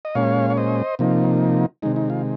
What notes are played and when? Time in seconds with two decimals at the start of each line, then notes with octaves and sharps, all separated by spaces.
0.05 D#5
0.15 A#2 G#3 C#4 C#5 F5
0.50 C#5
0.57 C5 D#5
0.99 C3 F3 A#3 D#4
1.82 C3 D#3 G#3 D#4
1.96 D#4
2.10 F4